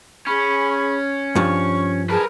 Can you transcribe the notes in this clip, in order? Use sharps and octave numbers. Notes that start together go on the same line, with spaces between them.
C#4 G#4 B5 C#6
G2 F3 C#6
G#4 A#4 B4 A5